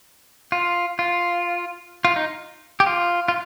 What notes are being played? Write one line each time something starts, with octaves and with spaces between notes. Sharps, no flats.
F4
F4
F4
D#4
G4
F4
F4